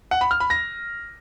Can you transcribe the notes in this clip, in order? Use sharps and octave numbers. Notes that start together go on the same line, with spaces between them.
F#5
B5
F6
B5
A#6